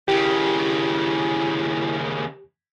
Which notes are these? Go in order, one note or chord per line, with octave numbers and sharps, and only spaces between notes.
D#2 C#3 E4 G4